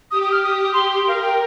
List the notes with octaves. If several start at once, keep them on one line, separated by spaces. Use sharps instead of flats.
G4 D#6
D#6
F6
D#6
C6
A#4 F5
G5